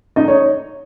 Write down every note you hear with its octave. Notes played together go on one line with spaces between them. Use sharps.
D#4 D#5
C#5